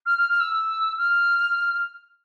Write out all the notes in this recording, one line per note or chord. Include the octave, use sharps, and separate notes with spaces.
F6
F6
F6
E6
F6